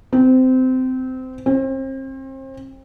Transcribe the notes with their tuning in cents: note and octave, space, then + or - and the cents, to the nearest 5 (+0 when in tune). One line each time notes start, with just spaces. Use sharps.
C4 -20
C4 +35